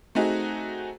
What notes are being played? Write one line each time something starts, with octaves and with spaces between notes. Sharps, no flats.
A3 C4 D#4 F#4 G#4